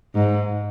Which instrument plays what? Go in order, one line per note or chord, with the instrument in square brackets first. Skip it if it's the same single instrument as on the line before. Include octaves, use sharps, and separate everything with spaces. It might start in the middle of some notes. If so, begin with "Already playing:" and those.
[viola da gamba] G#2